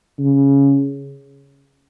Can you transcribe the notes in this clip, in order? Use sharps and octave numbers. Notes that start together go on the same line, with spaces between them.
C#3